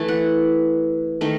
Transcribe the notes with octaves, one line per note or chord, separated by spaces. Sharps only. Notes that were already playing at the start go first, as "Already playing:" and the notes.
Already playing: E3 A3 E4 A5
F#5
D#3 A3 D#4